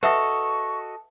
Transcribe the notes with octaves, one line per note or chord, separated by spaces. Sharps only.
F#4 A4 B4 D#5 E5 F#5 C#6